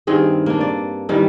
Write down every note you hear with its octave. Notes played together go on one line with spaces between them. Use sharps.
G2 D#3 C4 G#4
A#3 D4
D5
D#3 E3 G3